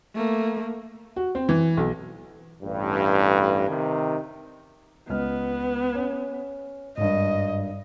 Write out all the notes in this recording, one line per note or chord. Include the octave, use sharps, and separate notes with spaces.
A3 A#3
F#4
C4
E3
B1
A1 G2
C3 D#3
C#2 B3 D#5 F6
C#4
G#1 G2 D#5